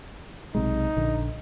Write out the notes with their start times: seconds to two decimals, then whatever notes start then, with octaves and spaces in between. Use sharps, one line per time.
0.55 B1 C3 G#3 D#4
0.97 A#1 D3